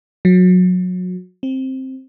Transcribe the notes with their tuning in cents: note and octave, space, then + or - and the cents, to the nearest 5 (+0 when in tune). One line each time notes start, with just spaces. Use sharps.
F#3 -25
C4 +10